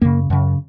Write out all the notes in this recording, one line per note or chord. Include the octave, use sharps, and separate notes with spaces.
F#2 C#3 A#3
F#2 C#3